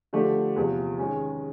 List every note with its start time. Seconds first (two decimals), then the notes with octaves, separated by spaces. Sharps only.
0.13 D3 F3 A3 D4 G4
0.56 E2 C3 F3
0.98 D#3 G#3 C#4